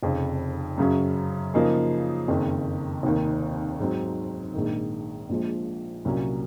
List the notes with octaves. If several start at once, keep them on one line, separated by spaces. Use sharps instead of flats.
F1 F2 C#3
F#2 C#3 F#3 C#4
C#3 F3 A#3 D#4 G#4
F#1 F2 D#3
F1 D#2 D#3
G#2 F#3 C4
A#1 G#2 D#3
A#1 A#2 F3 G#3
C2 A#2 F#3 A#3 C#4